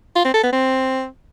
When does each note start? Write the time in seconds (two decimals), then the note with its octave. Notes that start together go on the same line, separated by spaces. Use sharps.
0.16 F4
0.25 C4
0.34 A4
0.43 B3
0.53 C4